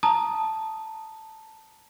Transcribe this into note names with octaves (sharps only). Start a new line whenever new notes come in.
A5 A#5 D#6